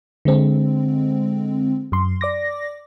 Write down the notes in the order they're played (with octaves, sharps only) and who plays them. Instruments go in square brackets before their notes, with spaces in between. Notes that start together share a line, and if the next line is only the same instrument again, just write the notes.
[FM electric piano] D3 G#3 C4
F#2 C6
D5 D6 A#6